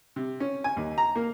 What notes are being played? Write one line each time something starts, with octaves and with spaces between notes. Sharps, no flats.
C3
C#4
G#5
D#2
A#5
A#3